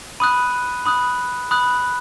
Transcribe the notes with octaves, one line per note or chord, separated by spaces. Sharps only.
B5 D#6 F#6 D#7
B5 D#6 F#6
B5 D#6 F#6